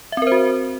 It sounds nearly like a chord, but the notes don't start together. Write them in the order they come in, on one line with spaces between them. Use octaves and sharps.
E5 C4 A#4 C5 F#4